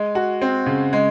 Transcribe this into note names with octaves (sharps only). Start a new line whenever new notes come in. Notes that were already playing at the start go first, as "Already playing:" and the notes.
Already playing: G#3
F#4
C4
C#3
G#3